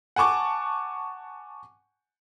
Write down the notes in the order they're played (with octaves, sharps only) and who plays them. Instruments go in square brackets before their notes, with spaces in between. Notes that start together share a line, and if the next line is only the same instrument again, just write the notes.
[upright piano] F#5 G#5 A5 C#6 D6